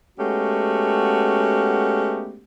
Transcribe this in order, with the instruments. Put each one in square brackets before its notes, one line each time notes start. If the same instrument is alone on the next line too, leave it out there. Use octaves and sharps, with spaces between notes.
[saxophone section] G#3 A3 B3 C#4 F#4 G4